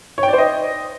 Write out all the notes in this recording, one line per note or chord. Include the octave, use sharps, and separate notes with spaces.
C#5
G5
D5
C5
D#5